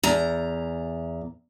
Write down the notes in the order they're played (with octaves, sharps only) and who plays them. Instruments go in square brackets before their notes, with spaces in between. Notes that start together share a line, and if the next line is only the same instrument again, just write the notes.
[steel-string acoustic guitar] E2 A#5